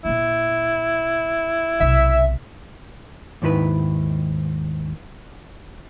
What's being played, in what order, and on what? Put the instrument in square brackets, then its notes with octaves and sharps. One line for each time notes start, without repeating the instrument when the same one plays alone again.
[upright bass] A#2 A#3 [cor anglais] E4
[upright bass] B1 C3 [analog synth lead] E5
[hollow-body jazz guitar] D#2 G#2 D#3 E4 B4